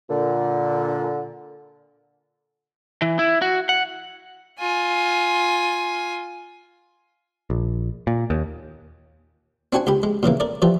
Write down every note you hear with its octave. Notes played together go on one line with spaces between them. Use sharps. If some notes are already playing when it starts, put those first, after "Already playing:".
A#2 D3
E3
E4
F#4
F#5
F4 G#5
A#1
A#2
D#2
C4 D4 F#4 F#5 G#5
C#2 G4 B5
G#3
A#2 C#3 E3 A#3
A#4 D5
E3 F3 G3 F4